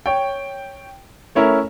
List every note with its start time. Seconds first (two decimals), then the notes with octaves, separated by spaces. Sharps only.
0.06 C#5 G5
1.35 A3 C#4 E4 A#4